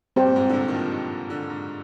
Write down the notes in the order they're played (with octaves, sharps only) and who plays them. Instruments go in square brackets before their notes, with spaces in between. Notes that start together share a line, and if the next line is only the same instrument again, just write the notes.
[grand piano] G2 [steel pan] C4 G4 C5 G5
[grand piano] A#2
G#2
D3
C3
D#3
F3
D#3
D3
G#2